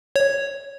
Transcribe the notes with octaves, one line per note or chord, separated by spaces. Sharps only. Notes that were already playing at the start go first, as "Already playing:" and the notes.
C#5